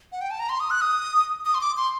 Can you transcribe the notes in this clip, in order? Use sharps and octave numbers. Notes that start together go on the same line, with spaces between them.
F#5
G5
A5
A#5
C6
D#6
F#6
D#6
D#6
C6
D6
C6